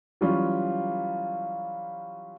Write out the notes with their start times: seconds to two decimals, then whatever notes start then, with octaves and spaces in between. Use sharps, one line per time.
0.21 E3 F#3 G3 C#4 F4